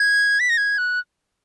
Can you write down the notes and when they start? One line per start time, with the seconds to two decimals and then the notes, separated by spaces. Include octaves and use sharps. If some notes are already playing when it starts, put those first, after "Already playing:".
Already playing: G#6
0.40 B6
0.49 A#6
0.57 G#6
0.78 F#6